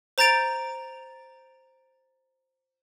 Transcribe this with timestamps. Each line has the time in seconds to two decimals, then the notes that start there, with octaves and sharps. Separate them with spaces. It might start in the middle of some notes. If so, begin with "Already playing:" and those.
0.18 C5 A#5 G6 A6 D7 F7